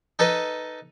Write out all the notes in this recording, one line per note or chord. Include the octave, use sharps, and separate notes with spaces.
D#4 A4 B4 D#5